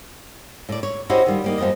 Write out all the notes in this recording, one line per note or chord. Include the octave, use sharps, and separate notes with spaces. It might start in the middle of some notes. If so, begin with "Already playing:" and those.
A2 D5
C#5
C#4 E4 F#4 G4 C5 D#5
D#3 G3 F4
G3 A#3 D#4
F#2 F3 G3 B3 D#5